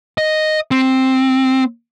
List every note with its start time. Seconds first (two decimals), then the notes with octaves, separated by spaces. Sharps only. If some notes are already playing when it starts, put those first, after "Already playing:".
0.18 D#5
0.71 C4